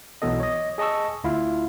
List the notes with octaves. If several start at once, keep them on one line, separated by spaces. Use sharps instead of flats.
B1 E3 F#3 B3 A4 D#5
C#5 D#5
G#4 D#5 A5 C#6 E6
D2 E4 F4 F5